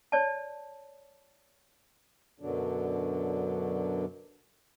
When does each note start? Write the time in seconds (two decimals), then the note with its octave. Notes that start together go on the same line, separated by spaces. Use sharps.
0.12 C#5 D5 A5
2.40 F#2 B2 D3 F#3 D4